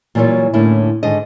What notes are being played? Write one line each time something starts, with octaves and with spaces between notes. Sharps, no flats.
A#2 E3 F#3 G3 F4 C#5
A2 D3 A#3 C#4 E4
G#2 D3 D#3 D#5